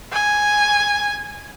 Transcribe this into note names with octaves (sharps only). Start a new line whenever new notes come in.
G#5